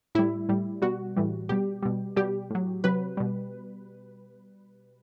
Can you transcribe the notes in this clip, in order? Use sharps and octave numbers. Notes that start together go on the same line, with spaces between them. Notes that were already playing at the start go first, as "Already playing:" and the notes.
A2 G3 E4
A2 G3
B2 G3 F#4
A2 E3 G3
B2 G3 G4
B2 G3
B2 G3 G4
A2 F#3
C3 F#3 B4
B2 G3